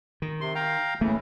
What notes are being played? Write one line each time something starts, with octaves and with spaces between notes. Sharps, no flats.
D#3
C3 C6
F5 G5 A#5
A2 C#3 E3 A3 A#3